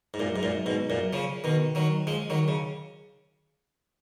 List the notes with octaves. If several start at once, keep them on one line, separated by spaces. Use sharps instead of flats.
G#2
F#2 A#2
G#2
F#2 A#2
G#2 B2
F#2 A#2
C#3 F3
B2 D#3
D#3 F#3
F3 G#3
D#3 F#3
C#3